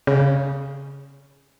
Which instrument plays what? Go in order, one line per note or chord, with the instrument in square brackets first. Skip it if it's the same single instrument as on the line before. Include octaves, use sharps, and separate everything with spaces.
[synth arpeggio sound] C#3